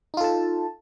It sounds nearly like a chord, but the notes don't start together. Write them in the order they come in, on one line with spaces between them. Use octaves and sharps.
D#4 F4 A4 A5